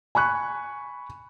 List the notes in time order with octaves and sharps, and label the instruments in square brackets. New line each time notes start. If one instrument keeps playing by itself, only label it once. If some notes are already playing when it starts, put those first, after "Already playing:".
[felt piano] G#5 B5 C#6 F#6